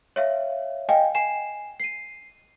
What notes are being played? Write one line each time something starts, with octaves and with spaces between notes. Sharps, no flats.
C#5 E5 F5
D#5 F5 G5 G#5
G#5 C7 E7
C7 D#7